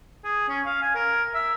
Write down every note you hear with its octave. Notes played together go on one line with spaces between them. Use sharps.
G#4
C#4
F5
G#5
A#4
E5